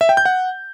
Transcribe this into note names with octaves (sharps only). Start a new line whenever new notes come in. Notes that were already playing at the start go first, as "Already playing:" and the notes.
E5
G5
G6
F#5